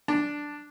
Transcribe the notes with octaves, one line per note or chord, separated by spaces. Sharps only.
D4